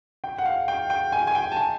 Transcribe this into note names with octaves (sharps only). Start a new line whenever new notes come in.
G5
F#5
F5
G5
G5
G#5
G#5
G5
A5
G#5